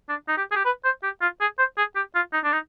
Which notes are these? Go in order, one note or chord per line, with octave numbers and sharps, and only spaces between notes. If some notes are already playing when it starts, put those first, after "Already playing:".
D4
D#4
G4
G#4
G4
B4
C5
G4
F4
G#4
C5
G#4
G4
F4
D#4
D4
D#4